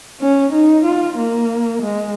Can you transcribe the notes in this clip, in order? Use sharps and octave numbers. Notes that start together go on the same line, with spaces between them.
C#4
D#4
F4
A#3
G#3